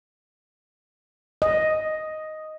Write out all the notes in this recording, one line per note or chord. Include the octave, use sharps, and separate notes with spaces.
D#5